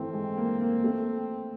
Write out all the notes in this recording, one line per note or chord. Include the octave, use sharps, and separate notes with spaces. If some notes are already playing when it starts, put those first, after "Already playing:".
Already playing: D#3 E3 A3 C4
G#3
A#3
A#3
A3